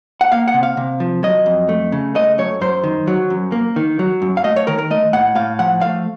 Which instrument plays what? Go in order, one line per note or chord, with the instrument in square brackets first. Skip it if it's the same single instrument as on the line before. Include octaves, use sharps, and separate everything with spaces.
[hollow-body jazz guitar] F#5
A#3 F5
F#5
C3
F5
C3
F3
F#3 D#5
F2
A3
C#3
A3 D#5
F#2 C#5
F#2 C5
D#3
F#3
F#2
A#3
D#3
F#3
F#2
F5
A3 D#5
C#5
D#3 A#4
A#4
A3 D#5
A2 F#5
A2 F5
F3 F#5
A3 F5